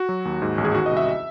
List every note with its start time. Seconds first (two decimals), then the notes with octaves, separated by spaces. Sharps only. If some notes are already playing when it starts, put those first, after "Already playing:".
Already playing: F#4
0.09 F#3
0.25 D#2
0.42 G#2
0.58 A1
0.65 G#4
0.75 D#3 F#4
0.86 D#5
0.91 C2
0.97 E5